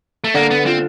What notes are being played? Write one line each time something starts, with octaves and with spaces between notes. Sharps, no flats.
A3
D3 A#3
B3
C4 F4